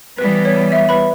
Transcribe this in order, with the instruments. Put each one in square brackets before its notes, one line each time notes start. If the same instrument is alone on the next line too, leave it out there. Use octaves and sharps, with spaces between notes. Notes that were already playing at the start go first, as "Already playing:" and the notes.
[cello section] E3 G3 B3 [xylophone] B4
[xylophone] C#5
E5
B4 B5